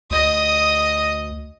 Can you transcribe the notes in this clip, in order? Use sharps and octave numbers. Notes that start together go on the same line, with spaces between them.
D2 D#5 D#6